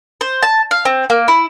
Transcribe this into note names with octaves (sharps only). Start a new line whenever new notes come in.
C5
A5
F5
C4
A#3
E4